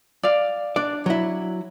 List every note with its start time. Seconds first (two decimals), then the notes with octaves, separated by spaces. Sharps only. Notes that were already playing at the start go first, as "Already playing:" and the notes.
0.23 D5 F5
0.76 D4 D5
1.06 F#3 E4